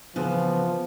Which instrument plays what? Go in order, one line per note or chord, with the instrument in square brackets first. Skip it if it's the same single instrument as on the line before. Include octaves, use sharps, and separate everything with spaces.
[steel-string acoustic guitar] C#3 E3 B3 [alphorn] F3